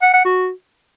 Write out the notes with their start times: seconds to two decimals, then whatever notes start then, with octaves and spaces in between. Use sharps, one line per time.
0.02 F#5
0.13 F#5
0.25 F#4